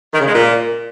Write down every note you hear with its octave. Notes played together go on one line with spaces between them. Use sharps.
D#3
C#3
G#3
A#2